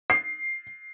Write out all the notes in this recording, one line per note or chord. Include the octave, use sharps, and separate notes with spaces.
C7